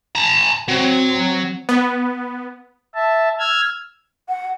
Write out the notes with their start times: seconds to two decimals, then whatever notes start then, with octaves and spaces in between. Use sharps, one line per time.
0.16 A5 A#5
0.68 F#3 C4
1.69 B3
2.95 E5 A5
3.39 E6 F6 G#6
4.29 F#5